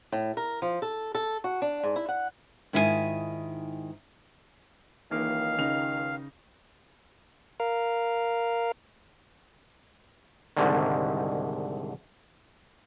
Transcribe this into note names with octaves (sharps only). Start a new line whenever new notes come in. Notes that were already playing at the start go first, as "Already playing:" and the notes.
A2
A#4
F3
A4
A4
F#4
D4
G#2
E4
F#5
G#2 D#3 E4 F4 G#4 G#5
C#2 D#3 E3 A#3 D#4 F5
C#3 D#4 F7
A#4 F5
C2 G#2 D3 D#3